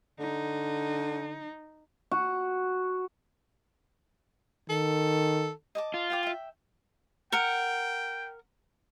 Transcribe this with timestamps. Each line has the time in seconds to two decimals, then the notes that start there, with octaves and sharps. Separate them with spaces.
0.19 D3 D#4
2.11 F#4
4.69 D#3 A4
5.75 D#5 A5 D6
5.94 F4
6.10 F5 G5 D6
6.23 E5 G5
7.32 A#4 F#5 G5